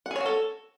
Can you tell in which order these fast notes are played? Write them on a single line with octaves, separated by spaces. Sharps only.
F#5 G#4 C#5 F#4 A4